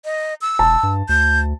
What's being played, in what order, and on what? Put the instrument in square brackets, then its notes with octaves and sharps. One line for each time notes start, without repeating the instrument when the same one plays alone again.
[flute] D#5
E6
[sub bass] E1 [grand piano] A5
[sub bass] G2
[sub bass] D2 [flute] G6